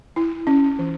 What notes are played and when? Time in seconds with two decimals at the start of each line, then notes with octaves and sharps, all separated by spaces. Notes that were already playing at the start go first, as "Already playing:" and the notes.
0.16 E4
0.47 C#4
0.79 E3